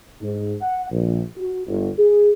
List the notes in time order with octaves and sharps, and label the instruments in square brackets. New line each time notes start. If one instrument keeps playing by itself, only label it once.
[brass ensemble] G#2
F#5
A#1
F#4
G1
G#4